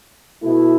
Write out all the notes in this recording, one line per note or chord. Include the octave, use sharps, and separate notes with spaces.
B2 A3 E4